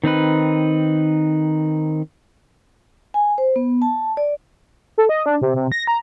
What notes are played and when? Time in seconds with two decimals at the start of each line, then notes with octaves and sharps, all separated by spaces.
0.04 D#3 C4 D#4 B4
3.14 G#5
3.38 C5
3.56 B3
3.82 A5
4.17 D5
4.98 A4
5.09 D#5
5.26 D4
5.41 C3
5.56 C3
5.72 A#6
5.87 A#5